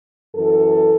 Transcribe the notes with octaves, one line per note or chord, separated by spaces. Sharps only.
F#2 E3 A4